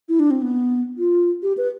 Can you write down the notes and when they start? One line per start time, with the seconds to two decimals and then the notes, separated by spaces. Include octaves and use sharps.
0.09 E4
0.20 D4
0.31 C4
0.42 B3
0.98 F4
1.43 G4
1.57 B4